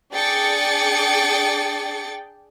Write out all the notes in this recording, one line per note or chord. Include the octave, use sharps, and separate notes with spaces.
D4 G#4 D5 G5 A6 C#7